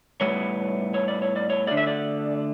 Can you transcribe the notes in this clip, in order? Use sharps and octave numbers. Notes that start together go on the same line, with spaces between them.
A2 G3 B3 C#5
C#5
D5
C#5
D5
C#5
D3 A3 D5
E5
D5